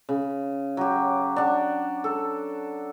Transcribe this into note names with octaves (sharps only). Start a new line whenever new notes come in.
C#3
F#3 G4
D4 F#5
A4